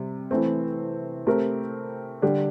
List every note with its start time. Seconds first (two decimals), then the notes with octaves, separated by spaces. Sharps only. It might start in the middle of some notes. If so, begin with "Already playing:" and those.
Already playing: C3 G3
0.31 E3 A3 C4
1.27 A3 C4 G4 A#4
2.22 D3 G3 D4 G4